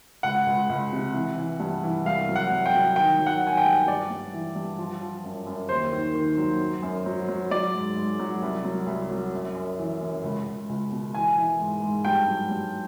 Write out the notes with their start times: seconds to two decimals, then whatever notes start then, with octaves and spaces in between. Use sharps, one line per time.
0.23 C#2 F#5
0.47 C#2
0.69 C#2
0.93 C3
1.14 E3
1.38 E3
1.60 G2
1.83 E3
2.05 C2 F5
2.29 F#3
2.36 F#5
2.51 C2
2.66 G5
2.74 F#3
2.96 D#3 G5
3.19 F#3
3.26 F#5
3.42 D#3 G#5
3.57 G5
3.65 G2
3.87 G2 D5
4.10 G2
4.33 E3
4.55 G2
4.78 F3
5.00 F3
5.24 F#2
5.46 F#2
5.69 D#2 C5
5.92 D#3
6.14 D#3
6.37 F#3
6.61 F#3
6.82 F#2
7.06 F#3
7.28 F#3
7.51 F#3 D5
7.74 G#2
7.96 G#2
8.19 F#3
8.42 C2
8.65 F#3
8.86 C2
9.10 F#3
9.33 F#2
9.55 F#2
9.79 E3
10.01 F#2
10.23 C#2
10.46 C#2
10.69 C#2
10.91 B2
11.14 E3 G#5
11.37 E3
11.60 G#2
11.82 G#2
12.05 G2 G5
12.28 F#3
12.51 G2